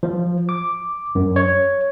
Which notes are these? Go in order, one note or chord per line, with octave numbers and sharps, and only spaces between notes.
F3
D6
F#2
C#5